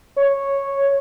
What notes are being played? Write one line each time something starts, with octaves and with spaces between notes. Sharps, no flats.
C#5